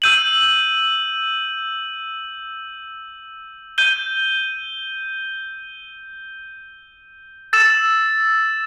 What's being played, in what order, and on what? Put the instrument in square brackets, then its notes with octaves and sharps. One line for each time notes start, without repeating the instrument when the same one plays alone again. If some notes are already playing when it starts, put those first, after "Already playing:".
[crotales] E6 G6 D#7 F#7
G6 D#7 G7
E6 A6 E7